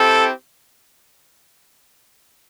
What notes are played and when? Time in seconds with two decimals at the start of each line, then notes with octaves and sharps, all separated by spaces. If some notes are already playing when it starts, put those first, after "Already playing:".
Already playing: C4 E4 G4 A4